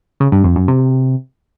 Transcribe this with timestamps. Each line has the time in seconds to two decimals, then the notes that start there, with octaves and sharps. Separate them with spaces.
0.20 C#3
0.32 G2
0.44 F2
0.56 F#2
0.68 C3